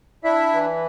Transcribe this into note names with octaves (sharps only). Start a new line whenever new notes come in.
D4 E4 E5
E3